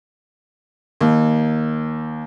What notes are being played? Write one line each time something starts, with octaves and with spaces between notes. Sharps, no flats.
D#2